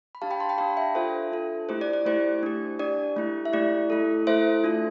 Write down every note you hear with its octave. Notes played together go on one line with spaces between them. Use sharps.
B5
D4 G4 F5 A5
G5 B5
A5 C6
G5 B5
D4 G4 F5 A5
E5 G5
D4 F4 A4 C5 E5
D4 F4 A4
A3 E4 G4 C5
D5
D5
A3 E4 G4 C5
D4 G4
D4 G4 D5
A3 E4 G4
E5
A3 E4 G4 D5
A3 E4 A4
A3 E4 A4 C5 E5
D4 F4 A4